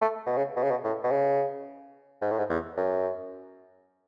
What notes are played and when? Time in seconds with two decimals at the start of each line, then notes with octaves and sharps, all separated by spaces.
0.01 A3
0.26 B2
0.37 C#3
0.56 B2
0.63 C#3
0.70 B2
0.84 A2
1.04 B2
1.11 C#3
2.21 G#2
2.30 A2
2.38 G#2
2.49 E2
2.77 F#2